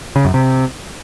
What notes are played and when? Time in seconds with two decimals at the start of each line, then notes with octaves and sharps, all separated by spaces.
0.16 C#3
0.25 F#2
0.34 C3